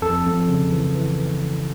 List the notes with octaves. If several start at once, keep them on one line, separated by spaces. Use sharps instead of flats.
F2 A4
F2
C#3
E3
E3